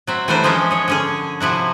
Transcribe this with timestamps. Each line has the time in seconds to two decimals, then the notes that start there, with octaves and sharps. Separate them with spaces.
0.07 F#3 C4 E5
0.28 E3 G3 A3 D4 A#4 C5
0.43 F3 G#3 C4 C#4 E5
0.71 G#4 C#5
0.88 D3 C#4 G#4
1.40 C3 F3 E4 F#4